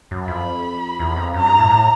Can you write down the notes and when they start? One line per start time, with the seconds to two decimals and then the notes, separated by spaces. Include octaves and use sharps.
0.11 F#2
0.28 F2 B5
0.99 E2
1.16 F2
1.34 F#2 A#5
1.46 G2
1.59 A2
1.70 A2